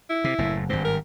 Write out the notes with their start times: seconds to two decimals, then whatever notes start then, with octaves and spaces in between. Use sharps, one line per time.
0.10 E4
0.24 C3
0.38 F#1 A2
0.69 G#1 G2 C4
0.85 A#4